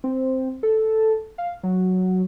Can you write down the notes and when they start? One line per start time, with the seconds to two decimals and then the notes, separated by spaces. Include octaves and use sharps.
0.04 C4
0.63 A4
1.38 F5
1.63 F#3